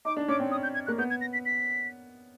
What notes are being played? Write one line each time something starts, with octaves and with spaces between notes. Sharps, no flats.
D#4 D6
D4
C#4 D6
C4
D#6
G6
G#6
A#3 F#6
B3 G6
G#6
A#6
B6
B6